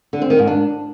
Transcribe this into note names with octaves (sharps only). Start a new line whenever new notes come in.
D3
C4
D#3
G#2
D4